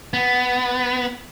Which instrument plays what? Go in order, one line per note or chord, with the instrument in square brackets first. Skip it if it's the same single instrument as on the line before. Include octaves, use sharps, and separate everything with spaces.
[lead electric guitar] B3